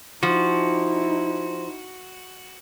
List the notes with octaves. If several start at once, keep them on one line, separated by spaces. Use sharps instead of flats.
F3 D#4 E4 F#4